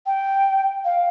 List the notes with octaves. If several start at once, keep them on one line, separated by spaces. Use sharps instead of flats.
G5
F5